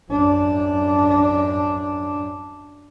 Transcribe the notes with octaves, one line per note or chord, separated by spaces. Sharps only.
F#2 D4